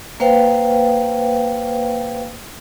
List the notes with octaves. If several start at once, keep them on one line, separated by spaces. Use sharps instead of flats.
A#3 B4 C5 F5 G5